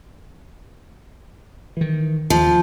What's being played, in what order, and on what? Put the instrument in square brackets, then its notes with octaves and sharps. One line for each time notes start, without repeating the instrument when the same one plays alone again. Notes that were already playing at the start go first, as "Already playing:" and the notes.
[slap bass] D#3 E3
[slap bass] D#2 [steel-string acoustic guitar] F3